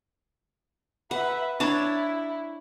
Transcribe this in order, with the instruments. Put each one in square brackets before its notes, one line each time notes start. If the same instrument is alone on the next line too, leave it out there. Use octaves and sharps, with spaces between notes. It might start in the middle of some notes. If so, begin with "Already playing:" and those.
[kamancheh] B4 E5 [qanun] F#5
[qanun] D4 C#5 A5 [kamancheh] E4